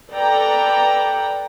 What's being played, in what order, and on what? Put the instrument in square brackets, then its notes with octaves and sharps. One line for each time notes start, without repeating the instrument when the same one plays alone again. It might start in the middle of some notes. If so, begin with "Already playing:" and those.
[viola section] A4 B4 D5 G5 A#5